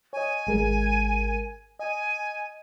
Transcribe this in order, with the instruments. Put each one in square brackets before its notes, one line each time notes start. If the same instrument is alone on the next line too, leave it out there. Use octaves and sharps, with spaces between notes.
[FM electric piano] C#5 D#5 [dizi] G#5
[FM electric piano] G#1 G#3 A#4
[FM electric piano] D#5 [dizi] G#5